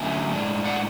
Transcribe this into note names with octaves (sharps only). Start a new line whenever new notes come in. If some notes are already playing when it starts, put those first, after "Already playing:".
Already playing: D3 F#3 A3 C#4 E5 G#5
A2 G#3 D4
D5 F#5